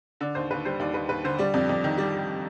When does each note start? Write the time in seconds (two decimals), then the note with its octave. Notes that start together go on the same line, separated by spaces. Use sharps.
0.21 D3 D5
0.35 D#2 C5
0.51 D#2 B4
0.65 G3 C5
0.79 D#2 D5
0.94 D#2 B4
1.09 D#2 B4
1.24 D3 C5
1.38 G3 D5
1.54 F2 D5
1.69 F2 D5
1.84 D#3
1.98 G3 D5